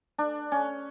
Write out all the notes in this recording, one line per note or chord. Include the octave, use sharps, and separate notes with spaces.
D4
C#4